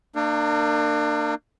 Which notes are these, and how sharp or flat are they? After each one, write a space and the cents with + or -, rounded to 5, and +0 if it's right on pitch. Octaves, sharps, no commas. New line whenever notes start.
A#3 -30 D4 +30 A#4 -35